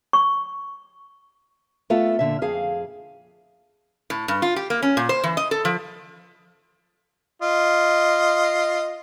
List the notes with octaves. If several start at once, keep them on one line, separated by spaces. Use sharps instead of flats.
C#6
A3 B3 F4 A4 E5
A#2 D3 E5
F2 G#4 F5
A2
G2
F4
G4
A#3
C#4
A#2
C5
E3
D#5
A4
F3
F4 D#5